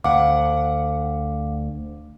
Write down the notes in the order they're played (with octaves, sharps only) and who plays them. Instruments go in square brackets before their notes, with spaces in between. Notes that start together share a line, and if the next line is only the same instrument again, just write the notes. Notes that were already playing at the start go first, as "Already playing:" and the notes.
[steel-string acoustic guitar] D2 F#5 [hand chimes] F5 D6